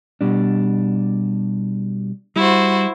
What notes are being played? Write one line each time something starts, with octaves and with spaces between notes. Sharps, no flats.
B2 G3 D4
G3 E4 F#4 C5